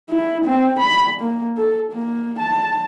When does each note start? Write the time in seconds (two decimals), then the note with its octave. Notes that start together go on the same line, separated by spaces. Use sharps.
0.10 E4
0.45 C4
0.79 B5
1.21 A#3
1.57 A4
1.92 A#3
2.39 A5